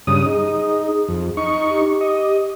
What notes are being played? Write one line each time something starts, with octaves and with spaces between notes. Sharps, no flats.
G2 C#3 D#6
D#4 G#4
F2
D#4 C#6
G4
D#5